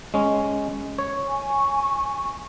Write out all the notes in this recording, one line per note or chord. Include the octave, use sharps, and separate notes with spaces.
G#3 C#4
C#5
G#5 C#6